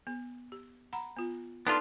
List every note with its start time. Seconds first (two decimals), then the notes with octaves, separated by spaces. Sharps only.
0.07 B3
0.52 G4
0.93 F#5 A#5 B5
1.17 B3 F4
1.67 B3 D4 D#4 F4 A4